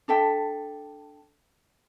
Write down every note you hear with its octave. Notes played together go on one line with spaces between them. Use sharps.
D4 A4 E5 G5